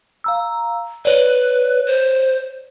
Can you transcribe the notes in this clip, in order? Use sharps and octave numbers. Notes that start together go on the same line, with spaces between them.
F5 A#5 E6
B4 C#5 D5
C5